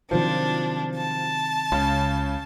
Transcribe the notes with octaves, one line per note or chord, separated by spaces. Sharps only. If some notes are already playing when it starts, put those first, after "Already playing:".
C3 D#3 F3 F#3 D4
A5
C#2 C#3